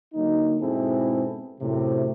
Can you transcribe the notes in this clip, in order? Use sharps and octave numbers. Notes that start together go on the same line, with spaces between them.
D3 F#3 A#3 D#4
G#2 B2 C4 E4 G#4 A4
F#2 A2 C3